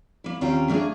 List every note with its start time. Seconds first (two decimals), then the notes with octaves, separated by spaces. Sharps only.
0.24 A#3 E4
0.41 D#2 C4 C#4 F4 G5 A#5
0.69 A3 A#3 D4 F4 G#4